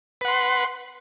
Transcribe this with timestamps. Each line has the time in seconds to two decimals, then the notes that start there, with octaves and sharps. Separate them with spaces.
0.21 B4
0.25 F#5
0.28 C6